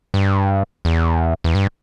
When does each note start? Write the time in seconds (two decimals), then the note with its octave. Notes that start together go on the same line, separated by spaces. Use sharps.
0.14 G2
0.85 E2
1.44 E2
1.55 G2